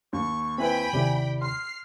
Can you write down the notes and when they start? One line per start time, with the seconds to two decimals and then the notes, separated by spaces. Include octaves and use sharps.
0.13 D#2 C#6
0.58 C4 E4 B4 G5 G#5 B5
0.93 D#2 C3 E4 G4 D5
1.42 C6 F6 C7